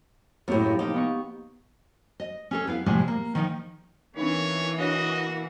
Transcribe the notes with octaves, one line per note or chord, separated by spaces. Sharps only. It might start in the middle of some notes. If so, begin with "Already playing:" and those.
F#2 A2 A#3 C4 G4
C3 F3 D#4 G4
B3 D#4 C#6
D#5
C#4 G#4 A4
B3 E4 F5
A2 C3 F3 G3 G#3
A#3
D#3 F3 D#4 G5
B2 E3 A#3 C4 D4 D#4 C#5
D4 F#4 C#5 D#5